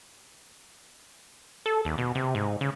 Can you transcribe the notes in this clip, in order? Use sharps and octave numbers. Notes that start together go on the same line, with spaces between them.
A4
D#2
B2
C3
G#2
C#3